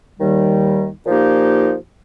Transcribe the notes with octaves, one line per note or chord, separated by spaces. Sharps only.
D#2 D#3 G3
A#2 F3 A#3 D#4 G4